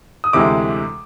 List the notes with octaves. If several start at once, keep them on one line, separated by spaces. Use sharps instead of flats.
D#6
D2 C3 E3 G#3 D6